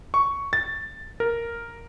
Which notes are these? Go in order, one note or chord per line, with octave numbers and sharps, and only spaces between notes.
C#6
A6
A#4